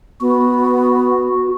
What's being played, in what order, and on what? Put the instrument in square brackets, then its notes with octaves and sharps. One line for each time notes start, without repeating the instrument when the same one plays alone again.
[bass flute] B3 [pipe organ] F#4